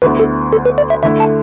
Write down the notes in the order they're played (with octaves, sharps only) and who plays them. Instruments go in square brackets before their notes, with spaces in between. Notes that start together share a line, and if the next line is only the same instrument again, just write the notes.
[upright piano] D2 D3 B3 E4 [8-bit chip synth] B4
[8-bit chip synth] A4
A4
B4
D5
E5
[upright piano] D3 A3 E4 [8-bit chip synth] E5
[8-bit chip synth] A5